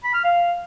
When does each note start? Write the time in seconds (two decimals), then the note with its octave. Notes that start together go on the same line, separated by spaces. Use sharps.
0.04 B5
0.14 F6
0.24 F5